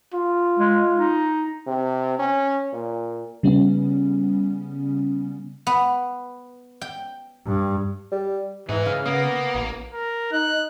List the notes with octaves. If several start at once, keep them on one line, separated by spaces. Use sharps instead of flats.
F4
G#3
D#4
C3
C#4
A#2
C#3 G3 B3 C#4
B3
G5
G2
G3
G#2 E3 D#4 G#4 B4
C#3 F5 F6
A#3 B3 D#6
A1
A#4
D#4 F#6